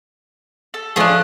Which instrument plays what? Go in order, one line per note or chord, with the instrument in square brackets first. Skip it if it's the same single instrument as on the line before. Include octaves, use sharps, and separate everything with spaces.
[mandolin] A4
[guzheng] F3 A3 [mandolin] D4 G#4